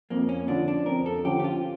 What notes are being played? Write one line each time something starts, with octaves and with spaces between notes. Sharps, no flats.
F2 A#3
C#4
D3 F3 C#4 D4
D4
F2 A#4
A4
D3 F3 C#4 G4
G4
F4